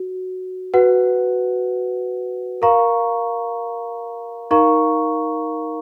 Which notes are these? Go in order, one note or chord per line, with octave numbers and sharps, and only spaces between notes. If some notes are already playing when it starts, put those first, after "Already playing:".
Already playing: F#4
F#4 B4 F#5
A#4 F5 A#5 C#6
D#4 A#4 F5 A#5 C#6